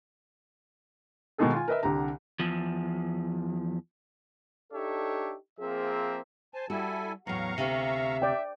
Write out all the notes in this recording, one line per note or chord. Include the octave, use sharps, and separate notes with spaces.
B2 D#3 G#3 D#4 G#4 A4
F4 G#5
A#4 B4 D#5 E5
C2 D3 G4 A#5
E2 F3
D4 D#4 G4 A4 C#5 E5
F3 A#3 C4 G#4 A#4 E5
C5 G#5 A5
G3 E4 F#4 A4 G#5
E2 A2 F#3 F5 A#5 C#6
D2 C3 E5
D5 G5